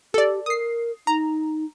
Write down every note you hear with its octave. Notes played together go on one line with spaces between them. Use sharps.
G4 A4 D5
A#4 D#6 C7
D#4 A#5